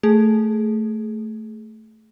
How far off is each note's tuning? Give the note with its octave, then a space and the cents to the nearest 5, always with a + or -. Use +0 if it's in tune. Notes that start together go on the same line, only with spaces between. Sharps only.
A3 +0 G#4 +10